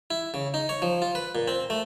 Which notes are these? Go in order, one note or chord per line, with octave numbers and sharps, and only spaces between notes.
E4
C#3
D#4
C#5
F3
F4
B4
A#2
C4
A3